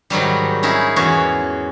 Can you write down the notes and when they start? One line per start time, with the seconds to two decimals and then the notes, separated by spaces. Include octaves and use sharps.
0.10 G#2 D#3 F#3 G3
0.63 C#4 D#4 E4 F#4 G#4
0.96 E2 C#4 F#4